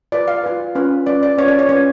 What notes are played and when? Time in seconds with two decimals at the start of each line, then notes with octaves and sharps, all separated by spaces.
0.12 F4 B4 D5
0.28 F5
0.43 F4 B4
0.75 C#4 F4 B4
1.06 C#4 F4 B4 D5
1.23 D5
1.38 C#4 F4 B4 C#5
1.48 D5
1.59 C#5
1.69 C#4 F4 B4 C#5